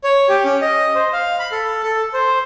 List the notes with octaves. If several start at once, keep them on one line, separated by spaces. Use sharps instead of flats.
C#5
G4
C#4
D#5
C5
F5
B5
A4
A4
C5